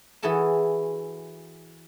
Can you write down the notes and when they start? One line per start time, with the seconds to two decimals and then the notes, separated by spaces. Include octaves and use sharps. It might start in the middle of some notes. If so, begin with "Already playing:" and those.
0.22 E3 E4 F#4 G#4 A4 A5